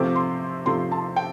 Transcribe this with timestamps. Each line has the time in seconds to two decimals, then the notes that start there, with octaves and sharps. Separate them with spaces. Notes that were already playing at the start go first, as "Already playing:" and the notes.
Already playing: C3 F3 A3 C4 D6
0.15 C6
0.65 C3 F3 A3 C4 C6
0.92 A5
1.16 G5